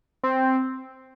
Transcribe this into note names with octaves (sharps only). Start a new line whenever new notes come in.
C4